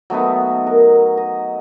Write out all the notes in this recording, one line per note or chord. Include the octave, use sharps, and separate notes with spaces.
F#3 A3 B3 D#4
A#4
D#5